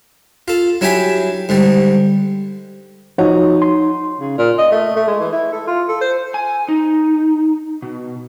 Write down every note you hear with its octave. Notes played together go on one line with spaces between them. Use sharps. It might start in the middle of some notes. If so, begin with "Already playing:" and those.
F4 A4
F#3 D4 E4 G4 G#5 B5
G#2 D3 G3
F3 D#4 F#4 C#5
C6
C#3
A#2
D#5
A3
A3
G#3
E3
E4
A4
F4
A4
C5
G#5
D#4
B2